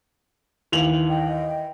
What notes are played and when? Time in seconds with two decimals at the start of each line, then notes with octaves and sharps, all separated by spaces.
0.72 D#2 E3 F7 F#7
1.08 D#5 G5